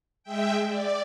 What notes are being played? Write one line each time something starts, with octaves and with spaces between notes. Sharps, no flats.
G#3 E5 G5
D5